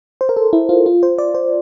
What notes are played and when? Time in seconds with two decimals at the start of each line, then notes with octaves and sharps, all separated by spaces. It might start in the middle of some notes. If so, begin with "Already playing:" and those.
0.21 C5
0.29 A#4
0.37 A4
0.53 E4
0.69 F4
0.86 F4
1.03 C5
1.18 D5
1.34 C5